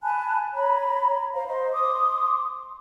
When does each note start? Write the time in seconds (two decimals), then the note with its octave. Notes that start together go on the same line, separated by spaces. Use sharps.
0.03 G#5 A5 B5 F#6
0.54 C#5 A#5 B5
1.34 C5 F5 A#5
1.48 C5 D#5 C6
1.72 C6 D6 D#6